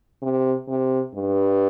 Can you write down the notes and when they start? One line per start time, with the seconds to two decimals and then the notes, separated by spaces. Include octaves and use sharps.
0.22 C3
0.68 C3
1.15 G2